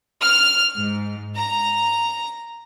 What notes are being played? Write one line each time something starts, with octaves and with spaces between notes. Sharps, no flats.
F6
G#2
A#5